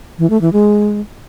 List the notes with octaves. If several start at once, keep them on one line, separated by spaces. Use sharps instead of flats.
E3
A3
E3
G#3